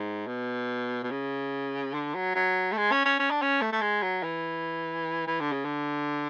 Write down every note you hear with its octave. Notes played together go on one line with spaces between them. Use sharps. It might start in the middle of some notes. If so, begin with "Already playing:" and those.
Already playing: G#2
B2
B2
C#3
D3
F#3
F#3
A3
G#3
C#4
C#4
C#4
D4
C#4
A3
A3
G#3
F#3
E3
E3
D3
C#3
D3